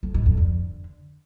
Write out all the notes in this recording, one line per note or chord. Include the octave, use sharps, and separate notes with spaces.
F2
G#2
F2
D3